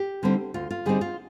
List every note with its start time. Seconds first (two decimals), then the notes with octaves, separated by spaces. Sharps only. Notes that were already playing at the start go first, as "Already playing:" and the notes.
Already playing: G4
0.23 D3 G3 C4 D#4
0.54 D2 F4
0.71 F4
0.86 D3 G3 C4 D#4 G#4
1.01 F4